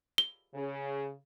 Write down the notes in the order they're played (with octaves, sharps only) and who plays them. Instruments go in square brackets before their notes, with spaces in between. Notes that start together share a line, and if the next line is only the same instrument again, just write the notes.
[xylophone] G7
[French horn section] C#3